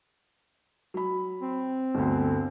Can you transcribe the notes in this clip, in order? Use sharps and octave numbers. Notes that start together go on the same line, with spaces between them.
F#3 B5
C4
G1 D2